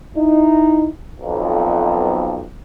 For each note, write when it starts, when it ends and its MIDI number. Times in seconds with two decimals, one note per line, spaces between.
0.17 0.87 63
0.17 0.87 64
1.20 2.44 35
1.20 2.44 41